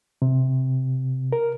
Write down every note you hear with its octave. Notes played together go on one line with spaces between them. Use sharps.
C3
A#4